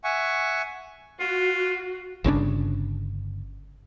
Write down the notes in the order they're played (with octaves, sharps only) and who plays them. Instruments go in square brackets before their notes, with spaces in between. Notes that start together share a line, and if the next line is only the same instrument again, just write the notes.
[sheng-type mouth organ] E5 F#5 G#5 C#6
[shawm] F4 [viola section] F#4
[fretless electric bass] G1 C#3 C4 D4